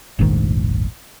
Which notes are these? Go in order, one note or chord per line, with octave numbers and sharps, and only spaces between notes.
F1 A#1 G#2 D#3